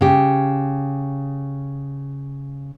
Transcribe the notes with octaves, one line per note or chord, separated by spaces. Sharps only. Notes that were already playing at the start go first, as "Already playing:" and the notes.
C#3 G4